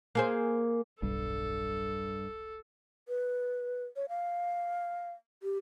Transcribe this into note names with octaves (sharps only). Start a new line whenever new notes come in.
A#3 G#4 C5
E1 B1 G2 G3 A4
B4
C#5
F5
G4